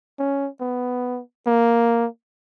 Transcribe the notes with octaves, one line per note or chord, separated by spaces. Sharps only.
C#4
B3
A#3